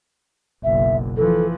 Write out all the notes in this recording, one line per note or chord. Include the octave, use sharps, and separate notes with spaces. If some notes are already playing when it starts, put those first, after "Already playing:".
F#1 B1 E5
E3 F3 A4